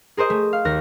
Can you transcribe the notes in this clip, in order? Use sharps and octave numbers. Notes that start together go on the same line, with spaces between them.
G#4 A#4 C5 D#5
A3
F5
D#2 A#4 F#6 A#6